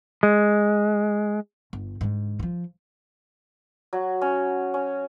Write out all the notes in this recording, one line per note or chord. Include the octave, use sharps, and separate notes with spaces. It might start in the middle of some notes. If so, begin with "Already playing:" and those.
G#3
G1
G#2 D3
E3 F3
F#3
C#4
C#4